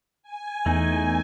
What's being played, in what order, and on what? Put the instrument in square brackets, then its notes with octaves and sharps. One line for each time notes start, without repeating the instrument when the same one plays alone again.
[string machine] G#5
[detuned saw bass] E2 [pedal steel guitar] A3 D#4